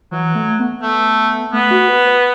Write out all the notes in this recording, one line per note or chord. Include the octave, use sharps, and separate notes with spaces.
E3 F#3
A3
B3
A3
A3 B3
F#4
B4
B4